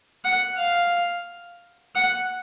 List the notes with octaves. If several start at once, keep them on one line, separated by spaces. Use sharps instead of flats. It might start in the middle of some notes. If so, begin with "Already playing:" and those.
F#5
F5
F#5